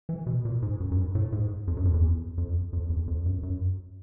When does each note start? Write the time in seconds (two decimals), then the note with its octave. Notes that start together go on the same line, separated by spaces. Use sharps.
0.09 E3
0.27 B2
0.45 A#2
0.62 G#2
0.80 F#2
0.92 F#2
0.97 G2
1.15 A2
1.32 G#2
1.67 F2
1.77 F#2
1.85 F2
1.94 E2
2.38 F2
2.73 F2
2.90 E2
3.08 F2
3.26 F#2
3.43 F#2